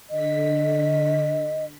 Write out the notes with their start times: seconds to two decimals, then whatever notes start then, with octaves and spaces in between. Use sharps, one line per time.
0.10 D3 D#5 B6